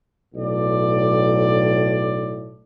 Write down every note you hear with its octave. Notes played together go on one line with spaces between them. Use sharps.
B1 A2 D5